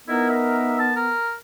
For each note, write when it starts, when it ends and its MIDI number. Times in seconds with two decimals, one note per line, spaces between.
0.08 1.14 59
0.08 0.91 63
0.08 0.28 64
0.08 0.91 70
0.29 0.76 76
0.79 0.96 81
0.96 1.34 70